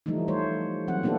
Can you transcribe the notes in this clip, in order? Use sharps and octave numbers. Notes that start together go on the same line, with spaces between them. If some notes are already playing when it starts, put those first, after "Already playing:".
E3 F3 G3 A3 D#4
A3 C5 C#5
E3 F#3 C4 F#5
A#3 B3 D4 E4 G4 A4